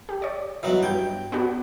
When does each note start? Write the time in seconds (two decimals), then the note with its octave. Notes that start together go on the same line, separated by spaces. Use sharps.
0.09 G4
0.22 C#5 D5
0.63 E3 F#3 B3 F#4 D#5
0.83 G2 G5 G6
1.32 B3 D4 F#4